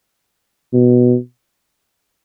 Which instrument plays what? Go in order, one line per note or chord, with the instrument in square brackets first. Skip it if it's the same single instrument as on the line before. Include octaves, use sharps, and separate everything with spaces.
[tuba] B2